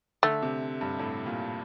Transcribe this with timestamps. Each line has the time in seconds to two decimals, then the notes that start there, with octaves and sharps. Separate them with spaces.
0.23 D3 A3
0.42 C3
0.81 G2
0.99 A2
1.26 A#2